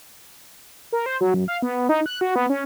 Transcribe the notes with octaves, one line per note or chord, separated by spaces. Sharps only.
A#4
C5
F#3
F#2
F5
B3
D#4
F#6
F#4
B3
C#4